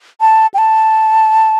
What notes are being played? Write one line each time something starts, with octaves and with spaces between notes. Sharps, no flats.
A5
G5
A5